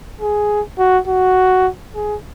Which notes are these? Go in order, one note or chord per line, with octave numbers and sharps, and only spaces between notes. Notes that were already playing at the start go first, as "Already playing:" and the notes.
G#4
F#4
F#4
G#4